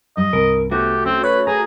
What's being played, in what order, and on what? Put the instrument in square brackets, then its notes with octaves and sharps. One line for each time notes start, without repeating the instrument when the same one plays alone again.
[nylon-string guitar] G2 G3 [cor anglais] D#5
[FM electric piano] C2 [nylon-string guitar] G2 C4 [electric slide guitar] A#4
[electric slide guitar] A3 F#4 [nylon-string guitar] B3 D4 C5 [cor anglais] G4
[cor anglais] C4 [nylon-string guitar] C#4
[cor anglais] B4 [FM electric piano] C#5
[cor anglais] G#4 [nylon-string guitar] B4 [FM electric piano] A#5